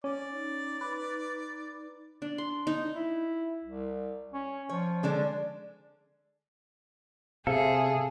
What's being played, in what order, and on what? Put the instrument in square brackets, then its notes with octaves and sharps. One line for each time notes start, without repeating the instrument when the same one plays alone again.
[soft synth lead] C#4 [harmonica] D5
[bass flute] D#4
[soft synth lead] B4
[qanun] D4
C6
D#4
[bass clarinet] E4
C2
C#4
[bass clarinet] F3 [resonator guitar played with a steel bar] C#5
[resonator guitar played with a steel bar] D3 G#3 D4
[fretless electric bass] C3 [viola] G#4 [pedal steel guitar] A4 [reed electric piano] E5 F5